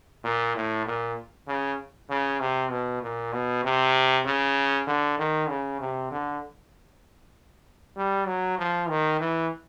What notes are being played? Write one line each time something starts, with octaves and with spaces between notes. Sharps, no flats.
A#2
A2
A#2
C#3
C#3
C3
B2
A#2
B2
C3
C#3
D3
D#3
C#3
C3
D3
G3
F#3
F3
D#3
E3